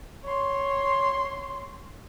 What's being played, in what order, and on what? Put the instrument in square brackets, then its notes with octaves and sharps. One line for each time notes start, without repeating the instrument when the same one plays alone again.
[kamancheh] C#5 C6